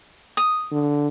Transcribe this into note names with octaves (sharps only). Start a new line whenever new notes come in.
D#6
D3